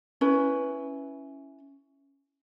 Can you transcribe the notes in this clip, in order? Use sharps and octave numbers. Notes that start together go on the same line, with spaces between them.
C#4 E4 B4